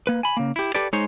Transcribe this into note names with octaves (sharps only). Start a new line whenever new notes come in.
A#3 B4
G#5 B5
C#3 A#3
E4 G4
G4 A4 B4 D5
G#3 D#4 C5 C#5